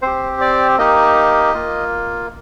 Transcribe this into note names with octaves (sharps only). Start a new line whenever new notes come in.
C4 G4 C5
D5
A#3 D#4 G4 D#5
A#3 F4